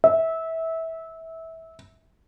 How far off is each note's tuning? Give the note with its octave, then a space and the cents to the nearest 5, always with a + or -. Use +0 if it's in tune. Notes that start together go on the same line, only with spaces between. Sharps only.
E5 -20